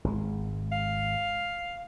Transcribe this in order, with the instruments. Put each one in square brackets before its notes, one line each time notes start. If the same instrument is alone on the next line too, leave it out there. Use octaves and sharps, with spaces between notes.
[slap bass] G#1 G#3
[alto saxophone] F5